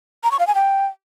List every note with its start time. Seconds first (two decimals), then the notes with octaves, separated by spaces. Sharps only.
0.24 A#5
0.31 C#6
0.39 F5
0.47 G#5
0.55 G5